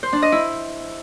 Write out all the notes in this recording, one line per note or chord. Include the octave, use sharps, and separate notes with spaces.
C5
D4
D#5
E4